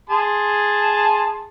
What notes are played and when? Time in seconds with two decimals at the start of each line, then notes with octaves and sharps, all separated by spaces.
0.10 G#4 A5 C6